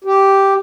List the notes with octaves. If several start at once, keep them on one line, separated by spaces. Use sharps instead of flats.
G4